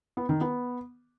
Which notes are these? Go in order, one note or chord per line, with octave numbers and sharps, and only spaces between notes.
B3
D#3
B3